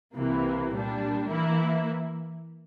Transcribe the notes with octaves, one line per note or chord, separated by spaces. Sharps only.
C2 C3 E3 A#3
A#2 G3 D4
E3 A#3 E4